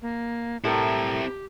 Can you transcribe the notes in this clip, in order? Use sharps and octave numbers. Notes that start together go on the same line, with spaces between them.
A#3
A2 C4 E4 G4 A4 A#4